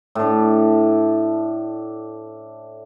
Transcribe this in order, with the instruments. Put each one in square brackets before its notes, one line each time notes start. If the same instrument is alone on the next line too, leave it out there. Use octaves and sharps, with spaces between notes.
[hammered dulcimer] A2 D4